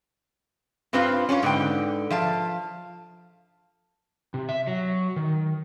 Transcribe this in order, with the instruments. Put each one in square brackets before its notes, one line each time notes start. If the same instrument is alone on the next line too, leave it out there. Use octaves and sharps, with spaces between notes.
[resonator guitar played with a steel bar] G2 C4 F4 B4 C5 F5
C#4 F4 B4 C#5
G#2 D3 B4 G5
F3 F5 A5
[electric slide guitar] C3
E5
F#3
D#3